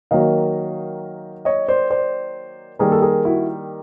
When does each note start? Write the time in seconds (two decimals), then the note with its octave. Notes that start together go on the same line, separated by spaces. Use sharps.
0.11 D#3 F#3 A#3 D#5 F5
1.45 C#5 D#5
1.68 C5 D5
1.91 C5 D5
2.79 D#3 G3 A#3 G#4 A#4
2.92 A4
3.02 G#4 A#4
3.25 E4 F#4